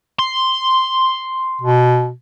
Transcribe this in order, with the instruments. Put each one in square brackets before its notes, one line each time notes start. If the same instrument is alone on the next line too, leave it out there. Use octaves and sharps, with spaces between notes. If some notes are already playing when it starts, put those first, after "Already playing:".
[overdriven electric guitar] C6
[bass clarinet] B2